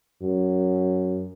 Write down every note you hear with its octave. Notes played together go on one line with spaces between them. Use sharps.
F#2